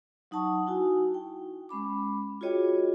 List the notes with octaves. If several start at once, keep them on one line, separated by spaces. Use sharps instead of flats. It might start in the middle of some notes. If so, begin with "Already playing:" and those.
F#3 D#4 F#5 A5 C#6 D#6
D#4 E4 F#4 G#5
G5
G#3 C#4 B5 D6
F4 F#4 G#4 C#5 D#5 G5